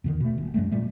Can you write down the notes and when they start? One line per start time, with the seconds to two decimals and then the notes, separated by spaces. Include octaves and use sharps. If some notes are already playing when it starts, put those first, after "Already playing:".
0.04 E2 D3 D#3
0.20 B2 A3
0.38 D#1
0.54 F#2 F#3 G#3 A3
0.71 A#2 G3 A3